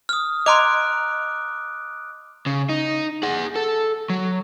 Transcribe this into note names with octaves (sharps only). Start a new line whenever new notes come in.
D#6 F6
D#5 A#5 C6 D6 F#6 D7
C#3
D#4
G#4 F#5
A4
F#3